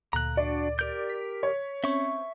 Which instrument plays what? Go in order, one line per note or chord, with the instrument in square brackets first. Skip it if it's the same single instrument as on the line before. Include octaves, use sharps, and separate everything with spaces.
[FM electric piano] D2 A#2 [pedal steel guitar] A#5 F#6
[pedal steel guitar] D4 F#4 [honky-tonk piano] D5
[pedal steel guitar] G4 A#4 G6
[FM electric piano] B6
[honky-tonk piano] C#5
[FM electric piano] C4 C#4 [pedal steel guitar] E5 C#6